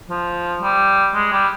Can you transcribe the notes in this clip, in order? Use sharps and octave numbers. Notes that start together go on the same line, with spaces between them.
F3
G3
G#3
G3